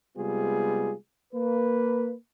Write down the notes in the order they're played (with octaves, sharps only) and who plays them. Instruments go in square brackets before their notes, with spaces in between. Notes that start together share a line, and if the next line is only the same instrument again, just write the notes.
[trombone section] C3 G3 G#3 B3 F4 G#4
A#3 B4